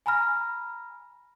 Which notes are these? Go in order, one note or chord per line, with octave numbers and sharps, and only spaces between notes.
G#5 A#5 B5 F6 A#6